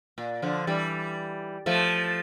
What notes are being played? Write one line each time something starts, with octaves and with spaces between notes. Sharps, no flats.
A#2
D3 F3
E3 G3
F3 A3